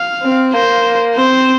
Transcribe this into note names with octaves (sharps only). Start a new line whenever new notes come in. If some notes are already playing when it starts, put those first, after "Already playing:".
Already playing: F5
C4
A#3 C5
C4 C5